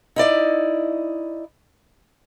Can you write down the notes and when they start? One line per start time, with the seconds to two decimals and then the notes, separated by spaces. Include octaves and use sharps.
0.16 D#4 E4 D5 D#5